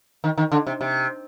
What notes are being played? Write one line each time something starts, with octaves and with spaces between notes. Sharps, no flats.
D#3
D#3
D3
C3
C3